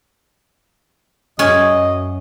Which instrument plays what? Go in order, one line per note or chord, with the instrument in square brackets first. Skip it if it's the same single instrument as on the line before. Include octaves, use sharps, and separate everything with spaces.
[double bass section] F#2 [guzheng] C#4 G#5 [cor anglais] D#5